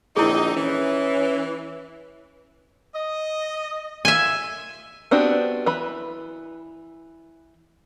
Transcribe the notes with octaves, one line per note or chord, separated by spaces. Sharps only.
A#1 D3 C4 D#4 E4 G#4
E3 C#4
D#5
A#3 F4 E5 G#5
B3 C4 D4 F#4 G4
E3 B4 B5